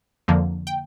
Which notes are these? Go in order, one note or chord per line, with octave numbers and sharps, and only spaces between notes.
F2 D3 F3 A#3
G5